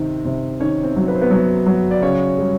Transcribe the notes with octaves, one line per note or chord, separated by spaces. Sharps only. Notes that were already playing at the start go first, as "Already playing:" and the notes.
Already playing: C3 D#3
C3
D#3 C#4 C#5
C4 C5
F#3
B4
C5
B3 B4
F#3
F#3
D5
C#3 C#4 C#5
G3